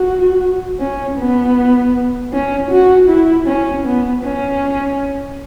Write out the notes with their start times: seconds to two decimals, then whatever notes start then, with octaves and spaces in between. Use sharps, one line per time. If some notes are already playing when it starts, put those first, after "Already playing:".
Already playing: F#4
0.80 C#4
1.18 B3
2.33 C#4
2.71 F#4
3.09 E4
3.48 C#4
3.86 B3
4.24 C#4